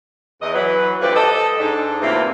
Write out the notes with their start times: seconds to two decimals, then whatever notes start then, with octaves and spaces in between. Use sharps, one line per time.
0.41 E2 D#5
0.54 E3 F#3 B4
1.01 D2 E3 F3 G4 B4 D5
1.15 A4 D#5
1.60 G#2 D4 D#4
2.01 A2 C3 E3 A#3 C4 F4